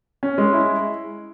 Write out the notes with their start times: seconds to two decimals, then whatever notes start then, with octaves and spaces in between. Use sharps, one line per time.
0.23 C#4
0.38 G#3
0.53 E4